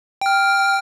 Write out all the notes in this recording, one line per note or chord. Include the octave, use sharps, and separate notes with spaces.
G5 F6